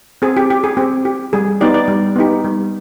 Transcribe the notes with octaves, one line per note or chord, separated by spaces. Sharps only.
C4 G#4
G4
G4
G#4
C4 G4
G4
G3 G#4
B3 D#4 G4 D5
D5
G3
B3 D#4 G4
G3